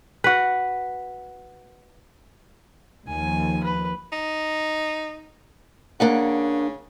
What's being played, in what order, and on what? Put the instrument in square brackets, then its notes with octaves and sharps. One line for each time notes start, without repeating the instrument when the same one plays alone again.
[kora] F#4 B4
[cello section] D#2 F3 [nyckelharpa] G#5
[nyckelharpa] B4
[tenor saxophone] D#4
[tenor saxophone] C#3 [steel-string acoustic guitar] A#3 D4 F#5